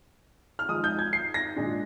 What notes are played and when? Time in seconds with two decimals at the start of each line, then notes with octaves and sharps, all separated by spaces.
0.59 F6
0.68 F3 G#3 D#4 D#6
0.84 G6
0.99 G#6
1.13 C7
1.34 A#6
1.56 A#2 G#3 D4